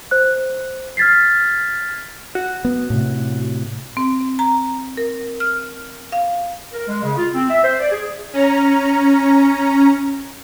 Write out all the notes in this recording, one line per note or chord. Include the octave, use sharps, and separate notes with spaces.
C5 F#6
F6 G#6 A6 B6 C7
F#4
B3
A2 C3
C4
A#5
A#4
F6
F5
A#4
G#3
C#3
F4
C4
E5
C5
D5
G#4
C#4 A#5